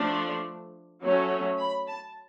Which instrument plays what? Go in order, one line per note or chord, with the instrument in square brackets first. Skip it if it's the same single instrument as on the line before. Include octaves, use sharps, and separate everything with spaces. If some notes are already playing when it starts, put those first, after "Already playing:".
Already playing: [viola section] F3 A3 D4
F#3 A3 C#4
B5
A5